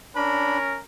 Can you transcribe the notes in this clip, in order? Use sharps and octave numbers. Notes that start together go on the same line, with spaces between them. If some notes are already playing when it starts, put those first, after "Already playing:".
C#4 D4 A#4 B5